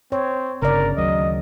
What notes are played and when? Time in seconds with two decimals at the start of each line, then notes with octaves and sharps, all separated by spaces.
0.12 C4 C#5
0.62 G1 C#3 A#4 D5
0.97 D2 D#3 F#3 D#5